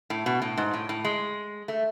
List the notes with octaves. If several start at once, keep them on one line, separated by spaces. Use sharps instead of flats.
A2
B2
A2
G#2
A2
A2
G#3
A3